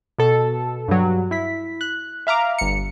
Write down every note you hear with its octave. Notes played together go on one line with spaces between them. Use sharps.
B2 A4
G2 F#3
E4 B6
F#6
E5 F5 A#5 D6
G1 C#7